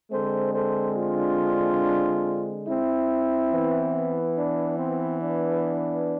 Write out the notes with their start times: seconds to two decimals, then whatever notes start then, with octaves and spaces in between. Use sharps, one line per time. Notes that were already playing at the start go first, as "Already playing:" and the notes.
0.11 D3 G#3 C4 A4 C5
0.54 A4 C5
0.96 D4 F4
2.66 C4 E4
3.51 E3 B3
4.36 D4
4.79 C4
5.22 D4